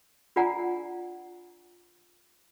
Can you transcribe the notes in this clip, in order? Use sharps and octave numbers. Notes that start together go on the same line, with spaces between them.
D4 F4 D5 F#5 G#5 A#5